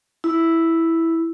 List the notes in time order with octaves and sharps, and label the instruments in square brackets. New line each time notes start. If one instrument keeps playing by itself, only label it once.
[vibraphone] E4